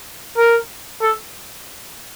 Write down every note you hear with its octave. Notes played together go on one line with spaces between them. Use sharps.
A#4
A4